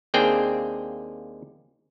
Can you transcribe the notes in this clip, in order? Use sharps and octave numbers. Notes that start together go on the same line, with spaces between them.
D#2 A#3 C4 D4 G#4 G5